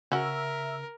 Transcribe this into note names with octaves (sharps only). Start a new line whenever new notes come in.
C#3 C#4 F#4 A#4 E5